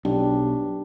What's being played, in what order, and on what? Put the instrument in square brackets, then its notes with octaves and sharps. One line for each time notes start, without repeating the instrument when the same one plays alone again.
[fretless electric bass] B1 [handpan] D4 G4